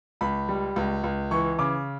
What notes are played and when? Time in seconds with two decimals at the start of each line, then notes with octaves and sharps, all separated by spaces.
0.21 C#2 B5
0.49 G3
0.76 C#2
1.04 C#2
1.31 E3 C#6
1.59 C#3 D6